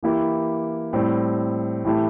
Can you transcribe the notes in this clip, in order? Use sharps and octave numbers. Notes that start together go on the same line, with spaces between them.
E3 A#3 E4 G4
A2 G3 C4
A2 E3 A3 E4 G4